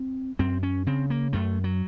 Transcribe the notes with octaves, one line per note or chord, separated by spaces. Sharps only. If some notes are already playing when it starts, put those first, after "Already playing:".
Already playing: C4
F#2 C4
C#4
C#3 C4
A#3
F#2 A3
F#3